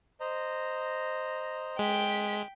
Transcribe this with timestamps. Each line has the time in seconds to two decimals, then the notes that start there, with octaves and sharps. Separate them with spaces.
0.20 C5 D#5 A#5
1.79 G#3 G5 B6